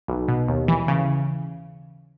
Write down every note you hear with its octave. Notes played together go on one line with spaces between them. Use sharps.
B1
B2
D#2
E3
C#3